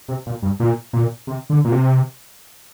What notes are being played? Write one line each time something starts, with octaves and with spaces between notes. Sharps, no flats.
C3
A#2
G2
A#2
A#2
C3
D3
A#2
C3